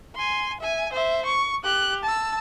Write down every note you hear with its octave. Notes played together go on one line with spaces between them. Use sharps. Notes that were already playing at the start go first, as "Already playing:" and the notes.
G#5 C6
E5 G#5
C5 E5
C#6
G4 F#6
A5 E6